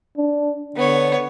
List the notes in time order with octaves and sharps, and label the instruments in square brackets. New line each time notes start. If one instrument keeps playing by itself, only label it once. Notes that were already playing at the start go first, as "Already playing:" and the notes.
[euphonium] D4
[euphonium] D3 [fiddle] B3 C#5